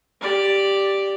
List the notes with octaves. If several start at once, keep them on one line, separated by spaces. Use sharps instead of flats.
G4 D5